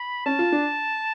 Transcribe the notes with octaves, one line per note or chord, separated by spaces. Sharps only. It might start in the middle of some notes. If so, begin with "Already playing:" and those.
Already playing: B5
C#4 A5
F4
D4